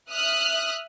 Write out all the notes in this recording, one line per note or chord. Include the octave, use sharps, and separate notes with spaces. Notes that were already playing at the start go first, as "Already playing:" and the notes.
E5 D#6 F6 F#6